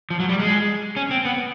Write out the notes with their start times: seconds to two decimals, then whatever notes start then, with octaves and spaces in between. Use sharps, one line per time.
0.10 F3
0.20 F#3
0.29 G3
0.39 G#3
0.96 C#4
1.11 C4
1.25 B3